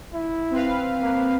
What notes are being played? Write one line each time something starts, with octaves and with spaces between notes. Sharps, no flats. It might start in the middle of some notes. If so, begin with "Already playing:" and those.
E4
C4 B4 F5
A#3